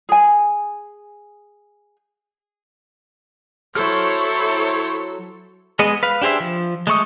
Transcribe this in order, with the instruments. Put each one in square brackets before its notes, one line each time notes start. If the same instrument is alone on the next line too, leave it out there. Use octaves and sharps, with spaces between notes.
[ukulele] G#4 G#5
[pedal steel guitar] F#3 F6 [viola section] E4 C5 C#5 [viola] A4
[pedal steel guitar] G#3 B3 G#4 D#5
B4 F5
D4 G4 G#4 C5 E5
F3
G#3 A3 C#6 D#6